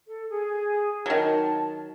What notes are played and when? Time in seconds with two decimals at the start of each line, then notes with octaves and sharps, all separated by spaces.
0.07 A4
0.30 G#4
1.06 D#3 F#3 A5